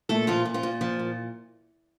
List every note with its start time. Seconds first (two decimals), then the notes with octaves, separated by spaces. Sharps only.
0.09 A#2 A3 A4
0.27 A#2 F3 F4
0.45 A#2
0.54 F3 F4
0.63 A#2
0.81 F3
0.99 A#2